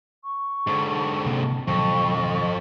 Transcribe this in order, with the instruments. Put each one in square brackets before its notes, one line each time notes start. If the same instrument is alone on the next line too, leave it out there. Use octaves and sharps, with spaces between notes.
[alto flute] C#6
[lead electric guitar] G#2 D3
[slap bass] D2 C3 A#3
[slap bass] G#1 B2 F#3 [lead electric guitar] F2 [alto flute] C#6